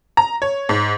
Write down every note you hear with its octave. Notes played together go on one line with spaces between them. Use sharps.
A#5
C#5
G#2